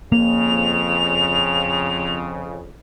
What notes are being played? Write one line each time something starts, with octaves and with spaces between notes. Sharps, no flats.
F2 C#3 A#3 F7